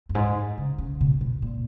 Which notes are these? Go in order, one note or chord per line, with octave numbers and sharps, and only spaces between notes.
F#2
G#2
C#3
C#3
B2
B2
A#2